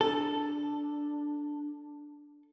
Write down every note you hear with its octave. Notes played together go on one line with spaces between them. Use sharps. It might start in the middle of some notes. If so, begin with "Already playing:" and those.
D4 A4